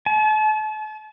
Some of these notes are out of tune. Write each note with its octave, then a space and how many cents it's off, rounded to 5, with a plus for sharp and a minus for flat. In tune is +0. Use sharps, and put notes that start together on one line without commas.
A5 -40